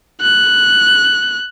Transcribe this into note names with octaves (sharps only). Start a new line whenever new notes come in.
F#6